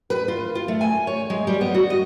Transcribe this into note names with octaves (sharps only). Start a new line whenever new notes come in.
B4
F4
F4
A3
G#5
C#5
G#3
G3
B3
F#4
D#5